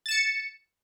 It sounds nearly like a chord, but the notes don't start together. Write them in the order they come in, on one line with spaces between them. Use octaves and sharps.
A6 E7 C#7